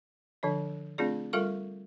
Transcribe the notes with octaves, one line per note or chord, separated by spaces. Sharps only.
D3 F3 D4 D#5
A3 C4 D4 F4 G#4 D5
G3 F4 A4 A#4 F5 C#6